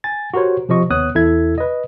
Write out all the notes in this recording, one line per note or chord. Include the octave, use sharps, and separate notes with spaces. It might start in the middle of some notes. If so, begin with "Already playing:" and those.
G#5 A6
F#4 G4 A#4 C5 C#5
C3 F3 G4 D#5 C#6
D#2 B3 C#5 D#6 F#6
E2 E4 A4 E5 G#6
B4 D#5